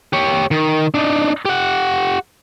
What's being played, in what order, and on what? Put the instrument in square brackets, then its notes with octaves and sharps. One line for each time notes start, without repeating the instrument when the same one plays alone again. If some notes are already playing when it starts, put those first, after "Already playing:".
[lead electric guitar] G4 C#5
D#3
D4 D#4
G4 F#5